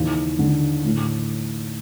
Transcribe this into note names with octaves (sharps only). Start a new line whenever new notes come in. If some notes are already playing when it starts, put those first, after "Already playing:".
Already playing: D#2 C#3 E3
D3
A2